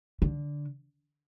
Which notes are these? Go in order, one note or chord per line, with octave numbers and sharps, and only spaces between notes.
D3